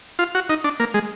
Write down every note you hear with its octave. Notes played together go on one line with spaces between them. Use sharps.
F4
F#4
D#4
D4
A#3
G#3